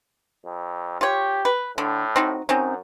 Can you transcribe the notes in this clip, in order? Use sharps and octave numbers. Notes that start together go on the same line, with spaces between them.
F2
F4 G4 C#5
B4
A2 D3
C4 D#4 F#4
F#2 C4 C#4 D#4